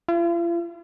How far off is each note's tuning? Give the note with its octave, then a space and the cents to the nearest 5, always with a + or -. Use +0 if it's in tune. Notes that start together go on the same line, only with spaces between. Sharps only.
F4 -45